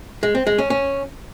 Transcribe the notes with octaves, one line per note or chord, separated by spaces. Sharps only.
G#3
C4
G#3
C#4
C#4